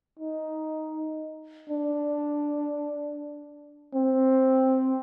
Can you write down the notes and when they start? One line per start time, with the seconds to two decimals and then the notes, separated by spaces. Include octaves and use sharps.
0.19 D#4
1.69 D4
3.94 C4